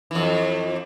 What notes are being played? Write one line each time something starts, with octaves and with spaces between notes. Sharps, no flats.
F2 E3